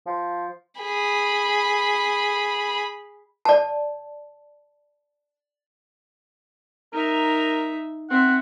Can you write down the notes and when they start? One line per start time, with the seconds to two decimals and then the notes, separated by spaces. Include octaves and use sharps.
0.06 F3
0.80 G#4 B5
3.45 D5 A5
6.93 D#4 A#4 E5
8.10 C4 E5 F#5